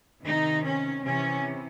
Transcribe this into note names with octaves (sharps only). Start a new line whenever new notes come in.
C3 D#3 D#4
C#4
C3 E3 C#4